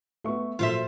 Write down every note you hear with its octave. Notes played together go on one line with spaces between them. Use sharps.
A3 B3 B4 E5 C#6
A#2 F3 F#3 F4 A4 C5 E5